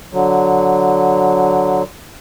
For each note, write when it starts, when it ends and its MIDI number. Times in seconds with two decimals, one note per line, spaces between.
0.13 1.83 50
0.13 1.83 54